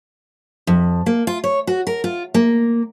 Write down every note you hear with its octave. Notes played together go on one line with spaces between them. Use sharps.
F2
A#3
F4
C#5
F#4
A#4
F4
A#3